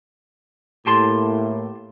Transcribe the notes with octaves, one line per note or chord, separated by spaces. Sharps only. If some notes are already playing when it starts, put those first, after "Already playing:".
A2 A#3 G4 A5 C6